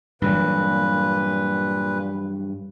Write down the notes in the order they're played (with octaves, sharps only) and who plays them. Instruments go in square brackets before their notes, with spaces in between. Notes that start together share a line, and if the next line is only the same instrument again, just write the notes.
[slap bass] G2 E3 F#3 [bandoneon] A#2 B4